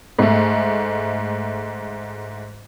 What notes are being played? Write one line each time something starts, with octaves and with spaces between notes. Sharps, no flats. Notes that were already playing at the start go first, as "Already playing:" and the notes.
G#2 A3